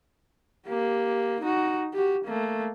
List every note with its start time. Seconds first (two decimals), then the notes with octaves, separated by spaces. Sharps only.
0.67 A#3 G4
1.41 D#4 F#4
1.94 F#4 G4
2.24 A3 A#3